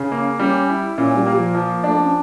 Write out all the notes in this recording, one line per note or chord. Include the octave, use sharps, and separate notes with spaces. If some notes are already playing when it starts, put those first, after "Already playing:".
Already playing: C#3 C#4
A#3
G3 C#4
E4
A#2 C#4
G3
A#3
F3
F3
A3 D4
A#3
C#4